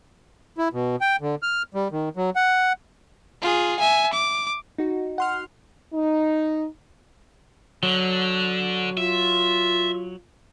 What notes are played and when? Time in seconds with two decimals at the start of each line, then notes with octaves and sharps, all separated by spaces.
0.58 E4
0.73 B2
1.01 G5
1.21 D3
1.43 F6
1.75 G3
1.92 D#3
2.17 F#3
2.36 F#5
3.42 F4 G#4
3.80 E5 G#5
4.13 D6
4.78 D#4 F#4
5.18 F#5 C6 F6
5.93 D#4
7.83 D3 F#3
8.97 F4 E5